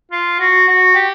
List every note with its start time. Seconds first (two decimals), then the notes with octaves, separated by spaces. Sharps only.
0.12 F4
0.39 F#4
0.68 F#4
0.94 G4